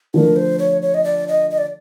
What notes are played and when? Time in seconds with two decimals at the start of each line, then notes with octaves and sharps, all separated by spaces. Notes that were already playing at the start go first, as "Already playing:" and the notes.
0.14 D3 F3 A3 A#4
0.36 C5
0.59 C#5
0.82 C#5
0.94 D#5
1.04 D5
1.28 D#5
1.51 D#5
1.58 D5